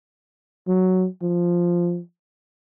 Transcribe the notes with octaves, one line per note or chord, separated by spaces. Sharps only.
F#3
F3